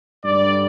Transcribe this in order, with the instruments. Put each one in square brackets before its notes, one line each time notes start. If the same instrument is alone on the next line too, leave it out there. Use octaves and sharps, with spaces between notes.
[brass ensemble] G2 D3 G3 D5